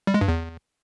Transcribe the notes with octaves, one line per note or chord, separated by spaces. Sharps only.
G3
G#3
G2
E2